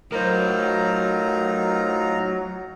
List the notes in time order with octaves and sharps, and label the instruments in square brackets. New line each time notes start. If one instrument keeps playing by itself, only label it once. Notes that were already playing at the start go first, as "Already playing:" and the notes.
[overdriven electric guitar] A2 [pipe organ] F#3 [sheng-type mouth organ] D#4 F4 A#5 [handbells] A#4 C5